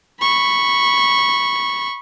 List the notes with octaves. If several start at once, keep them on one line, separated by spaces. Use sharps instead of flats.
B5 C#6